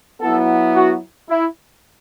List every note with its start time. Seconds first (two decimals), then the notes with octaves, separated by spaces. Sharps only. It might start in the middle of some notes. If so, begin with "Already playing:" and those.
0.20 F#3 B3 E4 A4
0.76 F#4
1.30 E4